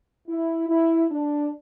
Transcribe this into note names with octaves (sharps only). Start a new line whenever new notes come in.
E4
E4
D4